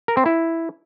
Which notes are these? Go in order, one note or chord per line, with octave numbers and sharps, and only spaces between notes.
A#4
C4
E4